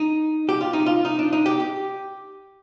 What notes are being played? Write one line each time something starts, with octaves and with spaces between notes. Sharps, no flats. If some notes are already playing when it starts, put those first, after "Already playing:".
Already playing: D#4
G4
F4
D#4
F4
D#4
D4
D#4
G4
G4